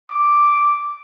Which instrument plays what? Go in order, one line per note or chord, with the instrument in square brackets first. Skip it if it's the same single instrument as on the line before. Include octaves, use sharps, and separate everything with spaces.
[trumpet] D6